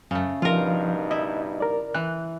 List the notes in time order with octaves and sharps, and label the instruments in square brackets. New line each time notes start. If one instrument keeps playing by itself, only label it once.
[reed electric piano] F#2 [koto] C#3 A3
[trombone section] G2 B2 D#4 [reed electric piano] F3 [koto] F4 A#4
[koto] E4 [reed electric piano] D#5
[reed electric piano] A#4 D5
[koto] E3 [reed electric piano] F#6